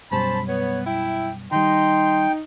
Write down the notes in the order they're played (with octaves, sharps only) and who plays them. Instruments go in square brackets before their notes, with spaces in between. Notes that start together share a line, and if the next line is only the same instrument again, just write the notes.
[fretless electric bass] F#2 B2 G3 [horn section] C#4 C5 A5 [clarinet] B5
[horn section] B3 [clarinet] C#5
[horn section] E4 E5 [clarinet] G5
[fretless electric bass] D#3 G3 [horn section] D#4 [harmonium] G5 [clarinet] C6